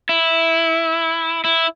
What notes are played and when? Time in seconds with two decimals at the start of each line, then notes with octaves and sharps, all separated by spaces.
0.09 E4
1.44 E4